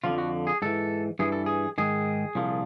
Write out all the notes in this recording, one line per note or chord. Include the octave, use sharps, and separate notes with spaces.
F2 D3 F3 F4
F#4
G#4
G#2 E3 A4
G2 E3 G#4
A4
G#4
G#2 D#3 G#4
C2 A#2 F3